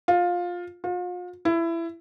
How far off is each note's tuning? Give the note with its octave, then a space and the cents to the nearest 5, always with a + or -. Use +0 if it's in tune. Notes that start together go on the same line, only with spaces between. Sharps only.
F4 +15
F4 +40
E4 +20